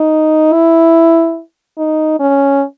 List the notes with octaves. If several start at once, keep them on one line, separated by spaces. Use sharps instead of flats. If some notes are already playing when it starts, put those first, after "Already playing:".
Already playing: D#4
E4
D#4
C#4